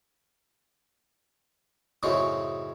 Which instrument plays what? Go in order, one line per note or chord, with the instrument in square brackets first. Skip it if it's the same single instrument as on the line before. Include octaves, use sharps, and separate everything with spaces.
[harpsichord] F#2 A2 C#3 C4 C#4 D#4